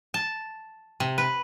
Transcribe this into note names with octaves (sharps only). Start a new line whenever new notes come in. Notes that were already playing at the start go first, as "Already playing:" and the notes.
A5
C3
B4